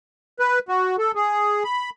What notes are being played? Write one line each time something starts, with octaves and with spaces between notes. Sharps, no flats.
B4
F#4
A4
G#4
B5